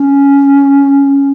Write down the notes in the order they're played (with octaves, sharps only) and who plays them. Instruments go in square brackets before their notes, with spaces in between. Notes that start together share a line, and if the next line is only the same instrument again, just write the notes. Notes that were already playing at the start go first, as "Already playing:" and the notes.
Already playing: [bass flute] C#4